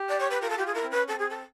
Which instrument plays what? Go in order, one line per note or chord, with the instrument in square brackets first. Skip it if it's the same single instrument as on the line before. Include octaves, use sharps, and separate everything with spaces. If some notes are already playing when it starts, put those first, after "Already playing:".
Already playing: [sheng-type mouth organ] G4
[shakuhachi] D5
C#5
B4
[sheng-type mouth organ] F4 [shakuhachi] A#4
[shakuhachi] A4
[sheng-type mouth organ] F4 [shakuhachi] G4
[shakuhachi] G#4
[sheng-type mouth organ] E4 [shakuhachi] A#4
[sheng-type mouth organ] C4
[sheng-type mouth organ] C#4 [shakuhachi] B4
[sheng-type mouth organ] C4 [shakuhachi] A4
[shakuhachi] G#4
A4